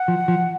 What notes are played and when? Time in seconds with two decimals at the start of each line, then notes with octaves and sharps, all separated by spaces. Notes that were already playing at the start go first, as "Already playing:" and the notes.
Already playing: F#5
0.08 F3
0.28 F3